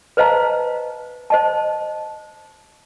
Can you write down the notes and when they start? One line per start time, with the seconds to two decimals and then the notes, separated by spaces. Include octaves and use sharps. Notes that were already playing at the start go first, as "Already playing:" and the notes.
0.17 B4 C5 D#5 F5 A5 A#5
1.30 C5 D#5 A5